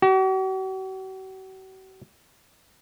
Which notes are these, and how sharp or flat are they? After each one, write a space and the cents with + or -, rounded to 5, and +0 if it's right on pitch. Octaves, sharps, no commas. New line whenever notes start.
F#4 +45